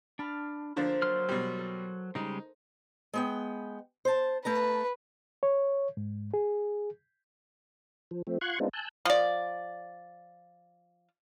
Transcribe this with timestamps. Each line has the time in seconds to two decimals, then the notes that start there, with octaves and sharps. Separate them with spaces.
0.19 D4 A5 B5 F6
0.76 D3 F3 A#3 D4 C5 B6
1.02 F#3 C6 F6
1.29 B2 G3
1.59 A4
2.15 C#3 G3 G#3 D#4
3.13 G#3 B3 G5
4.05 C5 A5
4.45 A3 B4 A5 A#5
5.43 C#5
5.97 G#2
6.34 G#4
8.11 F3
8.27 F3 A3 C4
8.41 F4 F#5 C6 C#6 F#6 G#6
8.60 G#3 B3 C4 D4 D#4 F4
8.73 G#5 A5 E6 F#6 G6
9.05 F3 D5